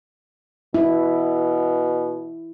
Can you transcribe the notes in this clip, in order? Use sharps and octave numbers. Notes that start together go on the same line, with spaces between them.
B2 E4